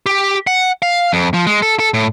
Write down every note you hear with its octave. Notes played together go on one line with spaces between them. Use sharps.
G4
F#5
F5
F2
F3
G#3
A4
A4
A2